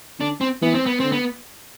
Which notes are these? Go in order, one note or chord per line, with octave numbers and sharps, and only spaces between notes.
D3 D4
C4
E3 B3
C4
B3
D3 C4
B3